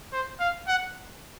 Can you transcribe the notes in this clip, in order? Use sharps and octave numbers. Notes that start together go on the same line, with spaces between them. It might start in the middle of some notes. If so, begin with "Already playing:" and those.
C5
F5
F#5